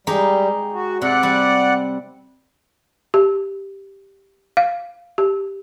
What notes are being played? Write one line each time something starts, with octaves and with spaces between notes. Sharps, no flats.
G3 G#3 D#4 G4
F#4
C3 D5 F#5
G3
G4
F5
G4